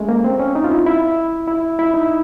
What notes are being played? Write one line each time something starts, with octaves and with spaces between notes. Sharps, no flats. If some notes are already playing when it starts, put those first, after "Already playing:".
Already playing: G#3 A3 C#4
A#3
C4
C#4
D#4
F4
E4
E4
E4
E4
D#4